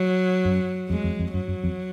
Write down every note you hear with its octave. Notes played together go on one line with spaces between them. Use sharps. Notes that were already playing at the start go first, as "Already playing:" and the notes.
Already playing: F#3
F#2
F2 G#3
F2
F2
F#2 F#3
F#2
F2